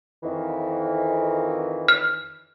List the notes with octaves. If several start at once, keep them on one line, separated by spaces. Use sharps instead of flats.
F2 D#3 E3
F6